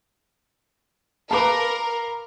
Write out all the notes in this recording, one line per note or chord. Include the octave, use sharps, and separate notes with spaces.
A#4 B4 F5 A5 B5 D6